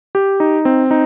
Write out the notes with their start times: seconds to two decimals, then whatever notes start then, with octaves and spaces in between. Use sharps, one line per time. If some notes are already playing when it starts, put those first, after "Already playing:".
0.15 G4
0.40 D#4
0.65 C4
0.91 D#4